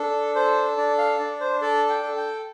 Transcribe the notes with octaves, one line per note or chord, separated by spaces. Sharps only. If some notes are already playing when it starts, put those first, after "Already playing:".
Already playing: D4 A4
A4 C5
D4 D5
F5
D4 D5
C5
A4 D5
G5
A4
G5